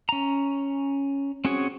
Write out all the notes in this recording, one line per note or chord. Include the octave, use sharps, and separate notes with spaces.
C#4 A#5
C4 C#4 F#4 G#4 C#5